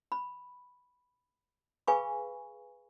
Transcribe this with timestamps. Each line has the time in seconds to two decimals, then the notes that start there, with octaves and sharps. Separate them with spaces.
0.12 B5
1.87 G#4 B4 F5 G#5 B5 C#6